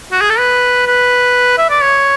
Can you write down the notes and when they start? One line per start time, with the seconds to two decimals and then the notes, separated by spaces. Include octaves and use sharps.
0.12 F#4
0.21 G#4
0.30 A4
0.39 B4
0.87 B4
1.58 E5
1.70 D5
1.82 C#5